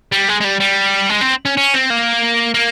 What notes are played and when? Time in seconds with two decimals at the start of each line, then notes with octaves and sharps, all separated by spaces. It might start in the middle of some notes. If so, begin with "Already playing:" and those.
0.12 G3
0.28 G#3
0.41 G#3
0.44 G3
0.60 G3
1.09 G#3
1.21 C4
1.45 C#4
1.57 C#4
1.74 C4
1.90 A#3
2.54 A#3